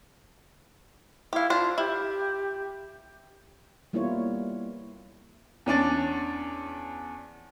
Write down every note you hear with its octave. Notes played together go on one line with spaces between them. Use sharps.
E4 G4 F5
D4 F4 C5
E4 G4
G3 A#3 B3 E4 F4 C#5
E2 C#4 D4 A6